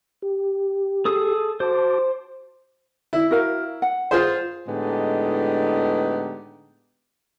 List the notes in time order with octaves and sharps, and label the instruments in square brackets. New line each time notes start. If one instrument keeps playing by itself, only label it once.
[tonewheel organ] G4
[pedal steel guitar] G#4 A4 D#6
[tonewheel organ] F#4 A5 D6 [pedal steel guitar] C5
[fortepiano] E4
[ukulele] F#4 A#4 F5
F#5
[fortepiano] F4 G#4 C5
[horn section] A2 D3 G#3 B3 D#4 G4